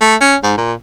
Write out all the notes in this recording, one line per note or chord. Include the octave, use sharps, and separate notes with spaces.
A3
C#4
G#2
A#2